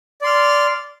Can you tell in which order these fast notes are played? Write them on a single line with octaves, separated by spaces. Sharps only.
D5 C6 F6